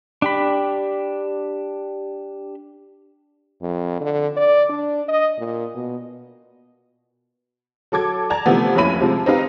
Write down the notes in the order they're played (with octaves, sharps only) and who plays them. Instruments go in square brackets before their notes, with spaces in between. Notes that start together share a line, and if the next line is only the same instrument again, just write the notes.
[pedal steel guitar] D4 G4 B5
[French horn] F2
D3
D5
D4
D#5
A#2
B2
[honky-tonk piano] F#3 A4 D6 G#6
D5 A5 A#5 G#6
C3 E3 F3 A3 B3
F1 D#2 C#4 E4 B5 D#7
C3 F3 G#3 C4
C4 D#4 G4 B4 F5 A#5